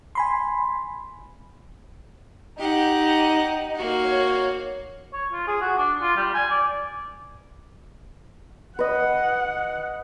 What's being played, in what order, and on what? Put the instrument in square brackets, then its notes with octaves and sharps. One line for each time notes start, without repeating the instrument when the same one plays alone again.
[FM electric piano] G#5 B5 C6
[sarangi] D#4 [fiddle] G4 F#5
[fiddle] A#3 F#4
[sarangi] C#5
[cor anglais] C#5
F4
G#4
F#4
D4
F4
G3
G#5
D5
[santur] B4 D#5 [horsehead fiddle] F#5